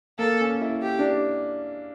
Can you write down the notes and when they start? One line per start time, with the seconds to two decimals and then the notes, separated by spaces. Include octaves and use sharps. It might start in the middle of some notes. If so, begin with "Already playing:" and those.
0.19 A#3 A4
0.41 C#4
0.61 E4
0.82 G4
0.99 D4